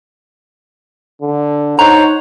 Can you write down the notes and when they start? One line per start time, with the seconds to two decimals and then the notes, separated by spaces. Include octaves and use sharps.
1.22 D3
1.79 D#4 C5 C#5 F#5 A#5